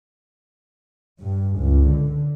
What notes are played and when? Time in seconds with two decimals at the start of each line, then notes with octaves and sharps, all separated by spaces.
1.21 G2
1.60 C#2
1.92 D3